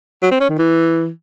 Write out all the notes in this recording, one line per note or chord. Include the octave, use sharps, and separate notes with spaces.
F#3
C4
C#4
D#3
E3